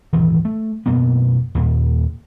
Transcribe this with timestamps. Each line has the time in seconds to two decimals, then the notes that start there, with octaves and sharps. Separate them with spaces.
0.13 D#1 G#1 E3
0.45 A3
0.86 F#2 B2 A#3 B3
1.55 D#2 A#2